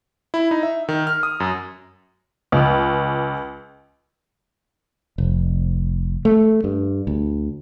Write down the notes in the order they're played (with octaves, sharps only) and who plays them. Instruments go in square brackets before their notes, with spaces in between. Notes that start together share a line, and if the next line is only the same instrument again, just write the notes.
[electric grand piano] E4
D#4
E5
D#3
F6
D#6
F#2
[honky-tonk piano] C#2
[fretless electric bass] F1
A3
G2
D2